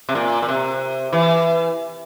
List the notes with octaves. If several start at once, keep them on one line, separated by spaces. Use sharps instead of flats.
C3
A#2
A#2
C3
E3